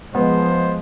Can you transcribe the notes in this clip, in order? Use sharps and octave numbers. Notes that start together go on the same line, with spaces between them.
F3 G#3 B3 C5